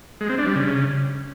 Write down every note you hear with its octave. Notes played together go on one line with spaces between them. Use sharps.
G#3
C4
D4
G3
C#3